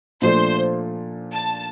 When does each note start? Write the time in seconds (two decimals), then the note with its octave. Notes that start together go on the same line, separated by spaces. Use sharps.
0.22 A#2 F3 A3 D4 C5
1.33 A5